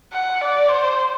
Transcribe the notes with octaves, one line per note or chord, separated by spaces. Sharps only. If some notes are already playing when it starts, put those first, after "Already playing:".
F#5
D5
C5